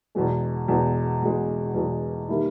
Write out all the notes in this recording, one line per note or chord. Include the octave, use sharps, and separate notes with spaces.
E2 B2 G#3
E2 B2 G#3
E2 B2 G#3
E2 B2 G#3
D#3 G3 A#3 E4